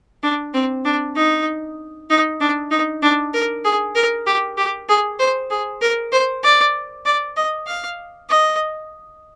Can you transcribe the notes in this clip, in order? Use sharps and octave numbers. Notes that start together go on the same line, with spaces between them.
D4
C4
D4
D#4
D#4
D4
D#4
D4
A#4
G#4
A#4
G4
G4
G#4
C5
G#4
A#4
C5
D5
D5
D#5
F5
D#5